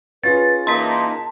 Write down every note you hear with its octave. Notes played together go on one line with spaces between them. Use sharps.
C#4 F4 G#4 B4 A6
E3 A#3 D#4 A5 C6 B6